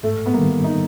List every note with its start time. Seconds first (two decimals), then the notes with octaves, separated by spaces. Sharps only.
0.03 G#2 A3
0.26 B3
0.33 D#3 G3 A#3
0.64 D#4